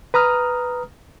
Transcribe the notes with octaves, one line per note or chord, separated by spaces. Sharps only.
B4 A#5 D#6 F6